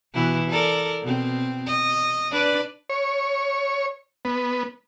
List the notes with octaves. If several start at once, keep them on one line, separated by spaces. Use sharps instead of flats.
B2 E3 E4
A4 A#4 D5
B2 C4
D#5
D4 B4 D5
C#5
B3